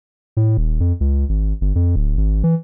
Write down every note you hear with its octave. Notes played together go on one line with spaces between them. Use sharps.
A2
D#1
F2
C#2
G#1
G1
F2
D1
G#1
E3